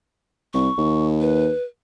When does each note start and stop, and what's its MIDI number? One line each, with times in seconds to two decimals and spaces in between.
0.54 0.69 36
0.54 1.05 85
0.77 1.50 39
1.21 1.63 71